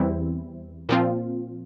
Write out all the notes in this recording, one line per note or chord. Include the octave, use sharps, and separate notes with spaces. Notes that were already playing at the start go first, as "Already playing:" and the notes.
Already playing: E2 E3 G3 C4 E4
A#2 F3 C4 F4